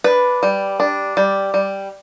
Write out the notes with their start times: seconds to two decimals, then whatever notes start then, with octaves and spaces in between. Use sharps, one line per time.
0.04 D4 B4
0.43 G3
0.80 D4
1.17 G3
1.54 G3